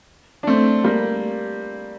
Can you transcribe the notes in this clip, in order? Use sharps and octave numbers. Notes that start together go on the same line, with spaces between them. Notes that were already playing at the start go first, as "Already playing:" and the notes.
D4
A3 C4
G3 A#3